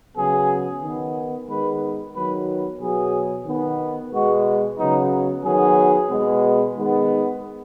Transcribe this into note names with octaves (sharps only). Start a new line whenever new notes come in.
C#3 F#3 B3 G#4
D#3 B3
D#3 G#3 B3 B4
D#3 F#3 B3 B4
B2 F#3 B3 G#4
D#3 B3
B2 G#3 B3 F#4
C#3 F#3 B3 D#4
D#3 F#3 B3 G#4
B2 G#3 B3
D#3 G#3 B3